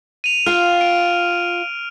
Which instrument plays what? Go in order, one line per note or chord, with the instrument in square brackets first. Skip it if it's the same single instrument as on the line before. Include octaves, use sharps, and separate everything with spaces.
[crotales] D#7 F7
[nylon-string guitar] F4 F5 G5 [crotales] F6
[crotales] D7